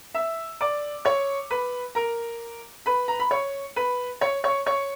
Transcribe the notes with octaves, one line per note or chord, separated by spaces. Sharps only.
E5 E6
D5 D6
C#5 C#6
B4 B5
A#4 A#5
B4 B5
A#5
B5
C#5 C#6
B4 B5
C#5 C#6
C#5 C#6
C#5 C#6